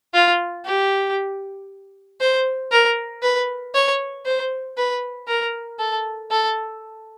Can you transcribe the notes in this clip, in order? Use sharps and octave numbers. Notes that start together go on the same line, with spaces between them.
F4
G4
C5
A#4
B4
C#5
C5
B4
A#4
A4
A4